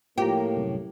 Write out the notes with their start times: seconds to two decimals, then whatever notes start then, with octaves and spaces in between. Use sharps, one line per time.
0.18 A2 F3 A#3 G4 A#5
0.57 C2 F#2